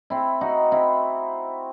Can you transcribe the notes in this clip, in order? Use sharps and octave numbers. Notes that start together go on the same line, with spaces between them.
C4 E4
D#4 F#4
C4 E4